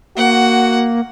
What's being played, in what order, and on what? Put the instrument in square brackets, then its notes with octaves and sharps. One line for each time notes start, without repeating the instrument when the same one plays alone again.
[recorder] A#3 [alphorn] F#4 [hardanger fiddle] F#5